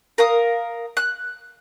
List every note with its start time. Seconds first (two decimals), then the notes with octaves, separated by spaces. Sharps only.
0.18 A#4 F5 D#6
0.97 F#6